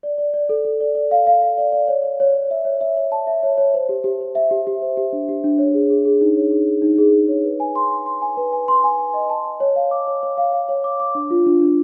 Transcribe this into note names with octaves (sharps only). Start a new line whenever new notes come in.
D5
D5
D5
A4
A4
D5
D5
F5
F5
F5
D5
D5
C#5
C#5
C#5
C#5
E5
C#5
E5
C#5
A5
E5
C#5
C#5
C5
G4
G4
C5
E5
G4
G4
C5
G4
D4
G4
D4
C#5
G#4
G#4
G#4
D#4
C#5
G#4
G#4
D#4
G#4
G#4
C#5
B4
G#5
C6
C6
C6
G#5
B4
G#5
C6
G#5
G#5
D#5
A5
A5
C#5
F5
D6
C#5
C#5
F5
F5
C#5
D6
D6
D4
F4
D4
D4